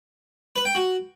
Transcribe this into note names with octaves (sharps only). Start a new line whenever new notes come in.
B4
G5
F#4